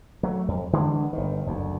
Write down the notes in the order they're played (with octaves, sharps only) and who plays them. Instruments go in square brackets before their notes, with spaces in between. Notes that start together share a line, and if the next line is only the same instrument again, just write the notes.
[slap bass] F#3 A3
F2
D3 E3 G#3
G1 D#3
F#1 D2